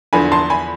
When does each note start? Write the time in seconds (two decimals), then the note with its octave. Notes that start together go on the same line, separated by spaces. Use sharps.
0.13 E2 D3 F3 G#5 B5
0.32 A5 C6
0.50 G#5 B5